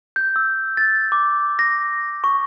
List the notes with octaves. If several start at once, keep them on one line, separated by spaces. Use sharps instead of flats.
G6
E6
A6
D6
A#6
C#6